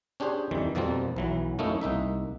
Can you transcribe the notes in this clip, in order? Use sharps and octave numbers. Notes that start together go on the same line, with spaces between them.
C#4 D4 G4 G#4 C5
F2 D#3 E3 G3
F2 B2 F3 G3 A#3 C4
B1 E3 F#3
F#2 A3 A#3 C#4 D#4 E4
C2 A#3 D#4 E5